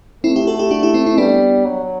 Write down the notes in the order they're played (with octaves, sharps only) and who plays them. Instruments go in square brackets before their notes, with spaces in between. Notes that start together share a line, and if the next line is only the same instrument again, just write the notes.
[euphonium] A3 [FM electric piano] C4 E4
[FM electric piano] E4 G4
F#4 A4
E4 G4
D4 F#4
E4 G4
C4 E4
C4 E4
[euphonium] G3 [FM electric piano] B3 D4
[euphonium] F#3